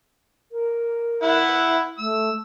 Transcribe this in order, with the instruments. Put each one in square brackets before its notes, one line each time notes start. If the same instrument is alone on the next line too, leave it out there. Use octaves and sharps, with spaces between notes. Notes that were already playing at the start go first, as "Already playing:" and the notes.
[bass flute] A#4
[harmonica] E4 E5 F#5
[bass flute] A3 [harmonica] E6